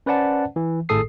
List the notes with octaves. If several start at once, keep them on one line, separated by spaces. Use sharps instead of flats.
C#4 B4 C5 D5 F#5 A5
E3
G#1 A2 G#4 A4 D#6 C7